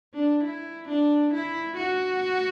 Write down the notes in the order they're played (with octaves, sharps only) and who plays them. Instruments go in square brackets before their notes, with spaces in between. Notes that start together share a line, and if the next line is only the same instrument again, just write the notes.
[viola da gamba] D4
E4
D4
E4
F#4